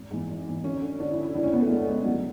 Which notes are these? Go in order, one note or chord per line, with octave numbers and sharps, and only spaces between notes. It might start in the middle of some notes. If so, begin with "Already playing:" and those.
Already playing: G#1
G#2 E3
G#1
G#2 E3
D2 C#4
D3
D2 D4
E4
D3
E4
C#2 D4
C#4
B2 B3
A3
C#2 G#3
B2 G#3
C#2 F#3